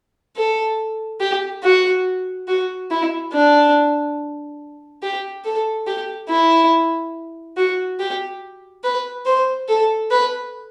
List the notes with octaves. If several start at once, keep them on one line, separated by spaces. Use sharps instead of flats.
A4
G4
F#4
F#4
E4
D4
G4
A4
G4
E4
F#4
G4
B4
C5
A4
B4